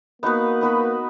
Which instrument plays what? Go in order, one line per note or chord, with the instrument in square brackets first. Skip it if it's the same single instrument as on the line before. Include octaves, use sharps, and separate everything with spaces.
[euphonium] A#3 [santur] B3 D#4 F#4 B4
[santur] B3 D#4 F#4 B4